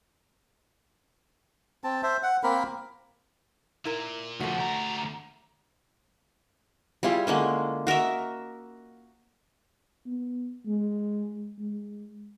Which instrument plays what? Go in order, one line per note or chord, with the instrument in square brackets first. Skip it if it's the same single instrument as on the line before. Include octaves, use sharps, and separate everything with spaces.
[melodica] C4 A5
C5 E5
F#5
A#3 C4 A#4 B5
[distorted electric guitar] A#2 [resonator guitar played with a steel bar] E4 A#4
[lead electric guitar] D2 F3 [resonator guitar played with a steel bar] A3 F#4
[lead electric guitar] D2 A#5 [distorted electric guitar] E4 G4
[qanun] G3 E4 F4 G#4
D3 G#3 A#3 C#4
F#4 A#4 D#5 E5
[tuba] B3
G#3
G#3